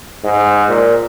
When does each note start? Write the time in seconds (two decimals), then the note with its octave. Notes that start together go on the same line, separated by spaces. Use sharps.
0.24 G#2
0.69 A#2